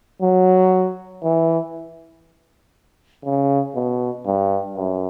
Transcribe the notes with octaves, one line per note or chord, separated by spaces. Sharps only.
F#3
E3
C#3
B2
G2
F#2